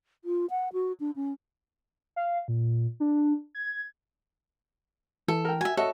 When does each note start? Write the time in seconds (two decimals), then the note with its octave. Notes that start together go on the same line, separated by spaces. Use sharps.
0.25 F4
0.50 F#5
0.73 F#4
1.00 D4
1.16 C#4
2.16 F5
2.48 A#2
3.00 D4
3.55 G#6
5.28 E3 A4
5.45 A#4 G5
5.61 F#4 E5 G#5
5.77 F#4 A4 C#5 D#5 E5